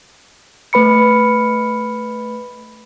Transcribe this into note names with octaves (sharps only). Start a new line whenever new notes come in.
A3 B4 B5 C#7